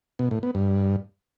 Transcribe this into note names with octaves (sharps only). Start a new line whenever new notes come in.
B2
A2
B3
G2